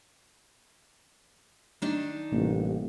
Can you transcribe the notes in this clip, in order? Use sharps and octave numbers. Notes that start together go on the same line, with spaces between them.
D#3 D4 D#4
A1 C3 G3 A#3